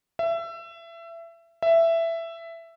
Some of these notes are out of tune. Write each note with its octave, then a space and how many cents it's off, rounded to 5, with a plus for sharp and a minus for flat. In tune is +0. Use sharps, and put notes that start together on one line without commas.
E5 +25
E5 +10